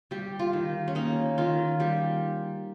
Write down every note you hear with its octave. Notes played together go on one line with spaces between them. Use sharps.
G3 G4
F4
D#3
C#4
A#3 D#4
D#3 F4
G3 G4